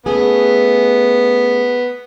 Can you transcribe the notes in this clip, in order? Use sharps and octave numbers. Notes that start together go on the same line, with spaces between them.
A3 B3 C#4 G#4